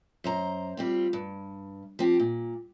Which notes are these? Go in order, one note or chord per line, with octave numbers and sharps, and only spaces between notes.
F#2 C5 A#5
G3 C4 F4
G2
F3 C4 G4
A#2